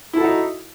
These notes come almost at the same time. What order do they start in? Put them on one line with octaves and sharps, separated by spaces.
E4 A4 F#4 D#4